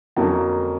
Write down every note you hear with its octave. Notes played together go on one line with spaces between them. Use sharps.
F2 D3 F#3 A#3 C#4 A5